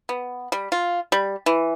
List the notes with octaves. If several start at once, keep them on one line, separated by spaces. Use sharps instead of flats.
B3
G3
F4
G3
E3